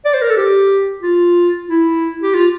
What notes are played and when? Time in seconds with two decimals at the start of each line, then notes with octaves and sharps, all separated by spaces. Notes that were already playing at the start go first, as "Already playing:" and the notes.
0.05 D5
0.14 C5
0.22 A#4
0.30 A4
0.37 G4
1.03 F4
1.68 E4
2.23 G4
2.34 F4